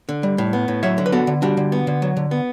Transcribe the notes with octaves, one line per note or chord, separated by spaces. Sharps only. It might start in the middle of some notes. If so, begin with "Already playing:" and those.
D3
G3
A2
B3
A2
F#3 C#5 E5
D3
B4
B3 F#4 A4
D3
G3 D4 F#4
D3
B3
D3
F#3
D3
B3